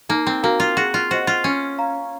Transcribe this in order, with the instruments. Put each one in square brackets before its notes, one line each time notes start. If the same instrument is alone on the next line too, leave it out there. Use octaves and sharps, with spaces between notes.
[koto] A#3 [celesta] D#4
[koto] C4
[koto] A#3 [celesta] F#4 A#4 F5 A#5
[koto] F4
[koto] F#4 [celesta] G#4
[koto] F4
[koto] F#4 [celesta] C5 D#5 F#5
[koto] F4
[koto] C#4 [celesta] C#5
[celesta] F5 A#5